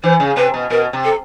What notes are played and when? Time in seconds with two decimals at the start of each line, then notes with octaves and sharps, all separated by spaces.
0.03 E3 C5
0.20 C#3
0.37 C3 B4
0.54 B2
0.70 B2 A#4
0.93 C3
1.04 A4